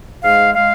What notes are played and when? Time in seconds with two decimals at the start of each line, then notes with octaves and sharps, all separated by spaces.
0.22 G#2 G#3 F5
0.54 G#3 F5